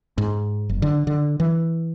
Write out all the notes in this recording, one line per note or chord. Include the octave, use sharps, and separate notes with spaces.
G#2
F#1
D3
D3
E3